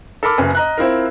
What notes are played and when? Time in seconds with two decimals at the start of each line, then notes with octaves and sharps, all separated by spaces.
0.23 A4 A#4 B5 D6 F6
0.38 F#1 F#2 B4 G#5
0.55 D#5 A#5 F#6
0.78 C4 E4 F4 A#4